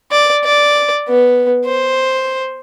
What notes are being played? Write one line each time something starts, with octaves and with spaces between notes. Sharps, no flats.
D5
D5
B3
C5